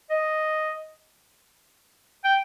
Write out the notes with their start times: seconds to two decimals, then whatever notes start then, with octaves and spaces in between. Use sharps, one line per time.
0.10 D#5
2.24 G5